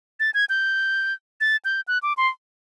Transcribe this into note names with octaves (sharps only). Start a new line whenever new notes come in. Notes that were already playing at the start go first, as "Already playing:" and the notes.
A6
G#6
G6
A6
G6
F#6
D6
C6